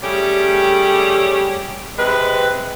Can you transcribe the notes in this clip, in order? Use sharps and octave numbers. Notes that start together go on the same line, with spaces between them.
G3 A3 C#4 G4 G#4
C3 G#3 B4